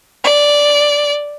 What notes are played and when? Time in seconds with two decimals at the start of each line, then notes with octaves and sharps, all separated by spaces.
0.24 D5